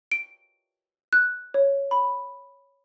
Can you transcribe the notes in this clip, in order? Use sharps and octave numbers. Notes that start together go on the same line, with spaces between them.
D7
F#6
C#5
B5